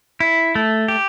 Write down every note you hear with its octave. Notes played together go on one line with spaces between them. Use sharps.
E4
A3
G4